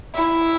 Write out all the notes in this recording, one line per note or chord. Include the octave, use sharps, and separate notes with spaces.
E4